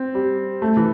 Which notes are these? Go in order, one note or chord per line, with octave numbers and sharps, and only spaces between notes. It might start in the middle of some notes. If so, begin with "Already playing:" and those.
Already playing: C4
G3
A3
E3